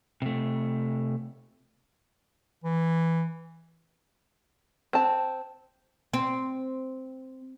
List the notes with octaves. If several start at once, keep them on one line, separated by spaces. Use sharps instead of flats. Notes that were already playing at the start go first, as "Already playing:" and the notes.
C3 A3
E3
C4 A5
C4